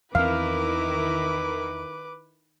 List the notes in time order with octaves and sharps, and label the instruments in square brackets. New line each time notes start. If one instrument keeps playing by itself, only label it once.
[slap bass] E2 C4 [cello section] D#3 E4 A#4 [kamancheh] B4 D6 [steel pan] F5